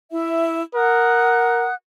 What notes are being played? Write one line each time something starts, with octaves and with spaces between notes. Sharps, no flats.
E4 E5
A#4 F#5 D#6 F#6